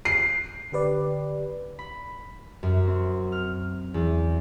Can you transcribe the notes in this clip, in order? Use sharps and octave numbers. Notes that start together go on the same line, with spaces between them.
C7
D3 G4 B4 D5
B5
F#2
C4
F6
E2